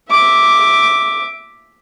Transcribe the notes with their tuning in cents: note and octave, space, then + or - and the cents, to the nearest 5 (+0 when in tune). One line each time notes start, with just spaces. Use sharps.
E5 -5 D6 +0